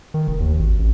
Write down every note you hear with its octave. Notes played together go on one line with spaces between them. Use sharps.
D#3
F1
D#2
G#1
A1